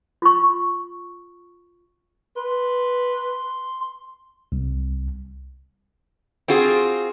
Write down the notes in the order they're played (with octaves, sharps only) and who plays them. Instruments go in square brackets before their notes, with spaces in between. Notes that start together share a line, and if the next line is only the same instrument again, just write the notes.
[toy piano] F4 C#6
[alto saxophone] B4 [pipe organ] C6
[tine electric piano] C2
[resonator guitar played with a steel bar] C4 F4 F#4 G#4